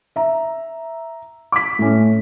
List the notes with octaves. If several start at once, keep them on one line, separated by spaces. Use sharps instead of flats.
E5 A#5
D6 B6
A2 C#4